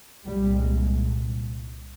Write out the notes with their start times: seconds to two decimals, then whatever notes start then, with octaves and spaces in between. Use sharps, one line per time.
0.25 C2 A#2 G3
0.57 G#3